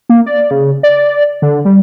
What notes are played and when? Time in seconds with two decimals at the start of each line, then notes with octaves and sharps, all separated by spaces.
0.09 A#3
0.26 D5
0.51 C#3
0.83 D5
1.42 D3
1.65 G3